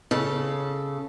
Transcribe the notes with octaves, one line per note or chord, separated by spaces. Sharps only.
C#3 A4